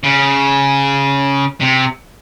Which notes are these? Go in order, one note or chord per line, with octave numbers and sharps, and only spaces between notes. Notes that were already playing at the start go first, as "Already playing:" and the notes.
C#3
C3